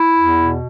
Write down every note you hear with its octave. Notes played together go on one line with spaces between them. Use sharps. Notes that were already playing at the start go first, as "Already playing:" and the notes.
Already playing: E4
E2
B2